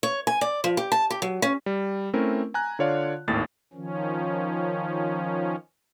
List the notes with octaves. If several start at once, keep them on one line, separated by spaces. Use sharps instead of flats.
C#5
G#5
D5
F3
G4
A5
G4
F#3
C#4
G3
A3 C4 C#4 E4 A#4
G#5 A#5 F#6
D3 F4 C#5 D5 F5
G#1 D#2 A2 A6
D#3 F3 C#4